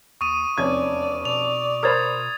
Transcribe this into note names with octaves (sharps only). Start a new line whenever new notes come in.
D#2 C#6 D#6 D#7
F1 E2 C#4 D5 G#6
B2 D5 F7
A#4 C5 B5 D#6 G#6 A6